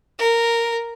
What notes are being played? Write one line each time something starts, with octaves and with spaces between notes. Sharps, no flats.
A#4